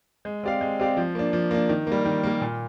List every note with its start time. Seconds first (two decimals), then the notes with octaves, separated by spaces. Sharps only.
0.25 G#3
0.43 C4 G4 D5 F5
0.61 G#3
0.79 C4 G4 D5 F5
0.97 F3
1.15 A#3 D4
1.33 F3
1.51 A#3 D4
1.69 D#3
1.87 G3 A#3
2.05 D#3
2.23 G3 A#3
2.41 A#2